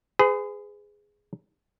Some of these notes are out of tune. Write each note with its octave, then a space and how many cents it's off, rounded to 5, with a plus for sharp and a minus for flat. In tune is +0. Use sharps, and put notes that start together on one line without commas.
G#4 +0 B4 +45